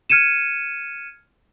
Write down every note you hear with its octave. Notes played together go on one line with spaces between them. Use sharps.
F6 G#6 C#7 D#7 E7